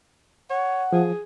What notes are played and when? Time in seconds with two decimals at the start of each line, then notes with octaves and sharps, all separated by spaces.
0.50 C#5 F#5
0.93 F3 G#4